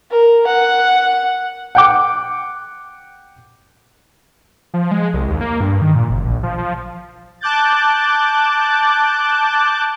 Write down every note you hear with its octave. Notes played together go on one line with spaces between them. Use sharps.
A#4
F#5
F#5 G5 D6
F3
G#3
C2
D#2
A#3
G2
D#3
A#2
F#1
A#1
F3
F3
A5 D6 F#6 G6 A6